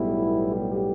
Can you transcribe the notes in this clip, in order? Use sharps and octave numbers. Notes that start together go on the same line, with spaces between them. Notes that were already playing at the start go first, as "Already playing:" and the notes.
Already playing: B1 A2 G3 B3 E4
G4